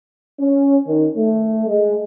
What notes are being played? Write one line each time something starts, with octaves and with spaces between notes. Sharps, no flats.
C#4
D#3
A3
G#3